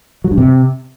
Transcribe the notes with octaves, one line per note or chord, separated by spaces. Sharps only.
F#3
G2
C3